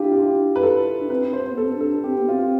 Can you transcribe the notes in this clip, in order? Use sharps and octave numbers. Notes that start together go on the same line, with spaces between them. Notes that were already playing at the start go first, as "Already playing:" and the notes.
Already playing: D4 E4 F4 G4
F4
G4
B4
A4
D4
C4 B4
C5
B3
A4
C4
D4
A4
C4 G4
B3
C4 F4